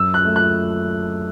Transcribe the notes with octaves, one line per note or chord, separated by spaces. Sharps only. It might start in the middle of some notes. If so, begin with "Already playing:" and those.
Already playing: F#2 E6
F#6
A3
F#6